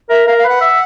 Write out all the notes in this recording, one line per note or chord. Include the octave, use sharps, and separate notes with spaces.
A#4 E5
A#4 F5
F5
B4 F#5
E5